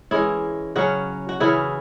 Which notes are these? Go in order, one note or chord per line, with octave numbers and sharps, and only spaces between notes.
E3 G#3 C#4 E4 G#4
C#3 F#3 C#4 F#4
F#4
C#3 E3 C#4 E4 G#4